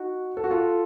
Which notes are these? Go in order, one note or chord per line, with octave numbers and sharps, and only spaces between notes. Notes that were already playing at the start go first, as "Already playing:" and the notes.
Already playing: D#4 F#4
A4
F#4
F4 A4